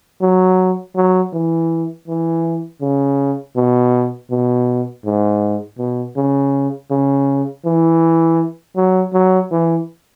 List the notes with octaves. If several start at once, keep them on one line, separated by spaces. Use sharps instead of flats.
F#3
F#3
E3
E3
C#3
B2
B2
G#2
B2
C#3
C#3
E3
F#3
F#3
E3